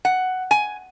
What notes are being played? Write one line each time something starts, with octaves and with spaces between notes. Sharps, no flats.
F#5
G#5